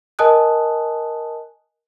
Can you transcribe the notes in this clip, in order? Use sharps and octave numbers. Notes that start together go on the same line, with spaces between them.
A#4 D#5 G#5 A5 D#6 F#6